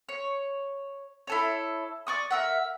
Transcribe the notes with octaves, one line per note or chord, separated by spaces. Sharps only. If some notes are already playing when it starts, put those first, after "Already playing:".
C#5
E4 A4 C#5
D5 C#6 D#6
A#4 E5 F#5